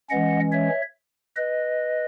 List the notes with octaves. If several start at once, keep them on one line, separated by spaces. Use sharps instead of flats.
E3 G#3 C#4 D#5 F#5
C#5 E5
B4 D#5